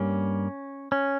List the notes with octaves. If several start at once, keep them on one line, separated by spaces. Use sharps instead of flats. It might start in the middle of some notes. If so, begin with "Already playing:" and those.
Already playing: G2 G3 A#3 C#4
C#4